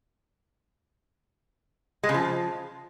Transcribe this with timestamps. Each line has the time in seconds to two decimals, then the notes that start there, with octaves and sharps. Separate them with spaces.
2.03 G#3
2.09 C#3
2.14 F3